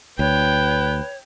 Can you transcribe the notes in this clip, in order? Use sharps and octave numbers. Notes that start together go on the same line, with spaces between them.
D2 B4 C#5 G5